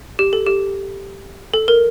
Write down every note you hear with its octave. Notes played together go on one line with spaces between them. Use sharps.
G4
A4
G4
A4
A#4